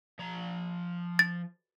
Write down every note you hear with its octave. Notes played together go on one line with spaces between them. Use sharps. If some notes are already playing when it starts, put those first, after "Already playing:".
F3 A#5
A6